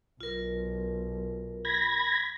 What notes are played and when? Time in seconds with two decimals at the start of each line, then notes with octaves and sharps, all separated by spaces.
0.21 B1 F4 A#4
1.65 B5 G#6 A#6